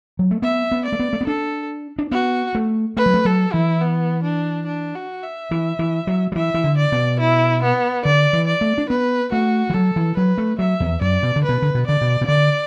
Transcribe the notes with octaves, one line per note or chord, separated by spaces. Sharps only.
F#3
A3
B3 E5
B3
D5
A3
B3
A3
B3
D4 A4
D4
B3 F#4
A3
A3 B4
F#3
A3
F#3 A4
E3 E4
B3
D4
D4
F#4
E5
E3
E3
F#3
F#3
E3 E5
E3
D3
D5
B2
E4
B3
D3 D5
E3
D5
A3
D4
B3 B4
A3 F#4
E3
F#3 A4
E3
F#3 B4
A3
F#3 E5
E2
F#2 D5
B2
D3
B2 B4
D3
B2
D3 D5
B2
B2
D3 D5